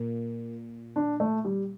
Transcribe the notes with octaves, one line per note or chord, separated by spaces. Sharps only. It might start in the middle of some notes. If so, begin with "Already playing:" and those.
Already playing: A#2 A#3
D4
A3
G3